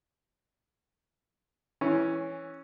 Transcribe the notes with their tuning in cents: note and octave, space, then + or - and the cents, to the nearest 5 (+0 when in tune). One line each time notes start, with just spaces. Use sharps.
E3 +0 C#4 +0